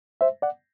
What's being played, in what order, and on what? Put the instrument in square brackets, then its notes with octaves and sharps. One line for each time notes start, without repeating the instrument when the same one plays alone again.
[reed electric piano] C5 E5
D5 F#5